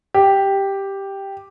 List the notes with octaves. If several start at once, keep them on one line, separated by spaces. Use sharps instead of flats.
G4